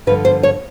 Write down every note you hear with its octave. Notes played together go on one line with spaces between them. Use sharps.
G2 D3 F3 B4
C5
C#5